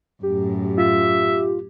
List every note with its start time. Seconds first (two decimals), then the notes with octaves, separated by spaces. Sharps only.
0.23 F#2 A2 G4
0.78 F4 E5